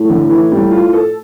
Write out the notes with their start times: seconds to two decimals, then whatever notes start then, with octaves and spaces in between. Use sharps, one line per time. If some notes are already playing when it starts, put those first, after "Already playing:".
Already playing: A2
0.10 D3
0.30 E3
0.52 G3
0.71 F4
0.93 A4